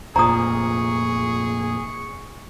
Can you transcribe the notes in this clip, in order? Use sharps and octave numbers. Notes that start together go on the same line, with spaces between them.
F1 A#2 G#4 A#5 C#6 D#6